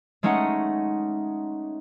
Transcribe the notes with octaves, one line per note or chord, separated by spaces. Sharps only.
G#3 A3 C#4 D#4 D#5 F#5